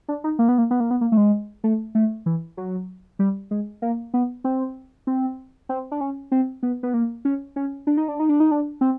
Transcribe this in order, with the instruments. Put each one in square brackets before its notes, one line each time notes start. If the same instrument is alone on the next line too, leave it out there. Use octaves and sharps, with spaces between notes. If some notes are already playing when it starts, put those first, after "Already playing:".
[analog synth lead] D4
D#4
A#3
B3
A#3
B3
A#3
B3
A#3
A3
G#3
A3
A3
E3
F#3
G3
G#3
A#3
B3
C4
C4
C4
D4
C#4
C4
B3
B3
A#3
C#4
C#4
D4
D#4
D4
D#4
D4
D#4
D4
C4